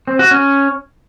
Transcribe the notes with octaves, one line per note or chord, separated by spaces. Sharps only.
C4
F#4
C#4